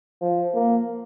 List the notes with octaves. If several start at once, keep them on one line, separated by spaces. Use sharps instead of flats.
F3
A#3